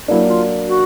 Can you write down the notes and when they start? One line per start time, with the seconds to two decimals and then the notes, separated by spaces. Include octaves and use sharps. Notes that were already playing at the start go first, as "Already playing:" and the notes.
0.08 F#3 A#3 D4 E4
0.29 F4
0.67 F#4